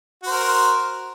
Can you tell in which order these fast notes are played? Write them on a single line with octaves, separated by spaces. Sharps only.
F#4 C5 A#4